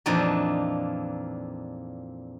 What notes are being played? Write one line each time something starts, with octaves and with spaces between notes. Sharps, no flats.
F2 A#2 E3 F3 D4 D#4